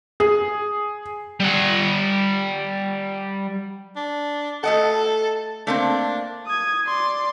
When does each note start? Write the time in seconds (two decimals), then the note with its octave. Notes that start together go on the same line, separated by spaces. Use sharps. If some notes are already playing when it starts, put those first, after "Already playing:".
0.20 G#4
1.40 G3 F#5
3.96 D4
4.64 A3 A4 D#5 F#5
5.67 A3 A#3 C4 D4
6.47 D#6 G#6
6.87 D5 C6